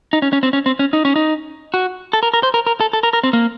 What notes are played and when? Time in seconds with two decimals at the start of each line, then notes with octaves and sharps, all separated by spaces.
0.13 D#4
0.22 C#4
0.33 C#4
0.43 C4
0.53 C#4
0.66 C4
0.79 C#4
0.93 D#4
1.05 C#4
1.16 D#4
1.74 F#4
2.13 A4
2.23 A#4
2.34 A#4
2.43 C5
2.54 A#4
2.67 A#4
2.81 A4
2.93 A4
3.03 A#4
3.13 A#4
3.23 C4
3.33 A#3